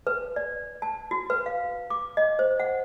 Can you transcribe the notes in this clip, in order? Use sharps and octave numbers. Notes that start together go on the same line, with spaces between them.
B4
D5
A5
F#4
B4
F5
D6
D#5
C5
F#5